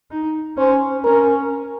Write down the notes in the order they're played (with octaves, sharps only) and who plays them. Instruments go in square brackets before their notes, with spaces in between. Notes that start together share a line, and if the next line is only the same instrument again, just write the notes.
[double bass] D#4
[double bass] C#4 [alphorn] C5
[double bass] C#4 [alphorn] A#4